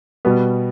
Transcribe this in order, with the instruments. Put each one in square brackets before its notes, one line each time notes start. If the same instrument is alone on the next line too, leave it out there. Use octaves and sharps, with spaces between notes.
[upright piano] B2 G3 B3